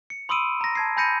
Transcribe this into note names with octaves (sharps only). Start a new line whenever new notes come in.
C#7
B5 C6 D#6 E6 D7 D#7
A#5 A#6
A5 G#6 C7
G#5 B5 G6 A#6 C#7 D#7